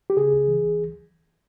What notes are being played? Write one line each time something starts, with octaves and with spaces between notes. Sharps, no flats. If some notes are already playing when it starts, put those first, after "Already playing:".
G4
C#3 G#4
C#2
E3
C#2